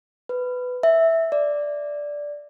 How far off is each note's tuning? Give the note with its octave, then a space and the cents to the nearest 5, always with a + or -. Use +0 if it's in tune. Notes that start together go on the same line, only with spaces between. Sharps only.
B4 +15
E5 -5
D5 -5